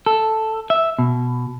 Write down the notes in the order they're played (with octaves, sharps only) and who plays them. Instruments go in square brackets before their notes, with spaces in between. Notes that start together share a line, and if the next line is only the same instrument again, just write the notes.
[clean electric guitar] A4
E5
B2